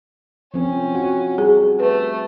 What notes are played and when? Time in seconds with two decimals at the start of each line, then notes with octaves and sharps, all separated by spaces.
0.54 F3 C4 C#4
0.95 F#4
1.38 G3 G#4
1.80 A3 B4